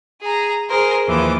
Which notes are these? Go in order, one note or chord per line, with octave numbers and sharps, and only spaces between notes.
G#4 A#5
G#4 A#4 C5
D#2 E3 F3 D6